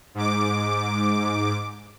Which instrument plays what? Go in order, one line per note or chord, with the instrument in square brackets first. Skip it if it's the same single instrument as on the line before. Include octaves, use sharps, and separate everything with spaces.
[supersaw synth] G#2 D6